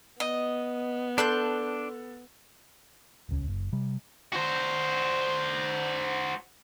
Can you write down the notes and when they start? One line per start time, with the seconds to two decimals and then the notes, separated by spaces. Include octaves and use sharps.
0.20 B3 D#5
1.18 D4 A4 C6 F#6 G6
3.29 D#1 C#2 C#4
3.48 F#1
3.73 C3 G3
4.33 F#4 C5